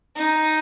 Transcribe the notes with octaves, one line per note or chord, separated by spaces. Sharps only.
D#4